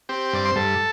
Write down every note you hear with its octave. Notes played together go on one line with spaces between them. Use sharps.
C4 G4
G2 D5
C5
G2 A4